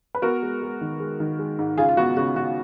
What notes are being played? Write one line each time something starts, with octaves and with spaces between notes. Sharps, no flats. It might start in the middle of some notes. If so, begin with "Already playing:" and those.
B4
B3 F#4 A#4
G#3
G#3
D#3
G#3
D#3
G#3
G#2
C#3 F4 G#4
F4
B3 F#4
C#3 F#4
C#3 F#4